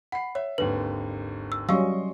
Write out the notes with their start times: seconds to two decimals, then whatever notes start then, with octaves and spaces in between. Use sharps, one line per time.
0.12 F#5 B5 C7
0.35 C#5 E5
0.58 G#1 D#2 D3 B4
1.52 E6
1.69 F#3 G3 C#4 D#5 F5 C6 C#6 E6